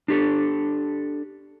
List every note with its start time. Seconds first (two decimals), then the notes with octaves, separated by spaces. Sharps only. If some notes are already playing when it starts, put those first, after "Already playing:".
0.08 D4 G4 A4